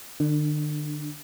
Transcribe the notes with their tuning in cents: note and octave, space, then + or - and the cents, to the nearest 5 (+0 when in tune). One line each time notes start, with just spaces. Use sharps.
D3 +40 D4 +0